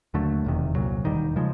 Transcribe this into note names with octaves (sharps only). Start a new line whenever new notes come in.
D#2 D3 F#3 A3
E1 E2 C3 D#3
C2 A#2 F#3
E1 D#2 D#3 G3
C#3 F3 G#3